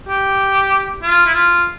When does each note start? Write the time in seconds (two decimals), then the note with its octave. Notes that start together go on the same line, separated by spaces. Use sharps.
0.09 G4
1.03 F4
1.26 E4
1.34 F4